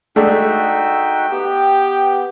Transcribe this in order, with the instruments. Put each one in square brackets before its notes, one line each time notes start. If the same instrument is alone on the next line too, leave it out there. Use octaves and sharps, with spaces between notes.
[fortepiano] G#3 A3 D4 [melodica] D#4 F#4 E5 [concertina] G5
[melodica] B3 [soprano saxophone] G4